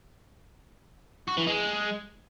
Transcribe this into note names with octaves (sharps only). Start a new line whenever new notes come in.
F#4
E3
G#3